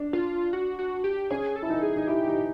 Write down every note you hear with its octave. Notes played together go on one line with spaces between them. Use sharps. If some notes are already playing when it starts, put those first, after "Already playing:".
Already playing: D4
F4
F#4
F#4
G4
C#4 G#4
A4
E4
D#4
G#4
D#4
E4 G4
D#4